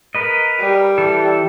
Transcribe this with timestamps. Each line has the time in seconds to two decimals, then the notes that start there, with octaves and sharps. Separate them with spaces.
0.15 A#4 B4 D#5
0.60 G3
0.98 E3 A4